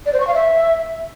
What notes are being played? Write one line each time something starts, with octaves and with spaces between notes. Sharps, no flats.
D5
C5
C#6
F5
E5